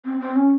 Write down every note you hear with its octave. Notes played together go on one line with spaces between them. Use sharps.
C4
C4
C#4